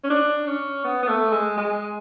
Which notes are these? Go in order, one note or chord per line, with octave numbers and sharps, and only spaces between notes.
C#4
D4
C#4
B3
B3
A3
G#3
G#3